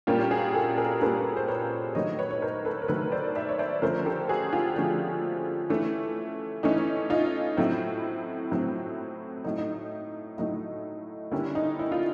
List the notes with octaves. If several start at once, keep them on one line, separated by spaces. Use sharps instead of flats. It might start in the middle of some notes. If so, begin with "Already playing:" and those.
A#2 G3 A#3 C#4 F4 G4
F#4 G#4
G4 A4
G#4 A#4
A#2 G3 A#3 C#4 A4 B4
C5
B4 C#5
D#3 F#3 A3 C#5 D#5
B4 C#5
C#5
A#4 C5
A4 B4
A#4
D#3 F#3 A3 A4 B4
C5 D5
D5 E5
C#5
C5 D5
D3 F3 A3 C#4 A#4 C5
G4 A4
F#4 G#4
F4 G4
D3 F3 A3 C#4
E3 A3 C#4
E3 A3 C#4 D#4
D#4 F4
A2 F#3 A3 C4 E4
A2 F#3 A3 C4
A2 F#3 A3 D#4
D#4
A2 F#3 A3 D#4
D3 G3 A#3 C#4 E4
D#4
E4
F4